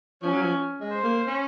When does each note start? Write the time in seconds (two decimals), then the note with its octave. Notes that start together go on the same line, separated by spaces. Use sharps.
0.22 F3 C#4
0.33 F#3
0.42 F3
0.81 G#3
0.92 C5
1.03 A#3
1.27 C#4